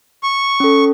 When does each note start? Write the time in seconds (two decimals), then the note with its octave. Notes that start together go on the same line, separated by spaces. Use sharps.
0.23 C#6
0.60 C#4 A4